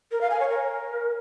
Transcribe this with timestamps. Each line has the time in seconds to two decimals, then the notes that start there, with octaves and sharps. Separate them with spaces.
0.11 A#4
0.21 F5
0.30 G#5
0.40 C#5
0.49 A#4